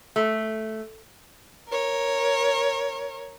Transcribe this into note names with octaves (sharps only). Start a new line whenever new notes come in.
A3
A#4 C#5